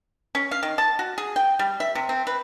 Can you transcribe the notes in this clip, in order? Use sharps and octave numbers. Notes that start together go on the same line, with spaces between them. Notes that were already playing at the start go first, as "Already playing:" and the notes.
C#4
F5
D#3
A5
F#4
G#4
G5
G3
E5
C3
C4
B4